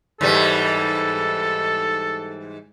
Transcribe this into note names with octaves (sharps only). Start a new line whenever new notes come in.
G#2 E3 G3 A4